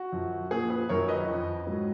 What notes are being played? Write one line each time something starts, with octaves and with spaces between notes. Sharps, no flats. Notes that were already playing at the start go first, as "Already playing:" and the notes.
Already playing: F#4
F#2 F3
A#2 F3 G#4
G#4 B4
F#2 D#3 F#3 A#4 C#5
B4 D#5
F2 F3
G#2 F#3